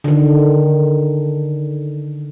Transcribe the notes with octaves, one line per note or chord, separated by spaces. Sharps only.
D3 D#3